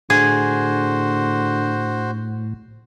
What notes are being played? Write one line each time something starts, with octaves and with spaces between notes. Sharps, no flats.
A2 D3 F#4 G#4 C5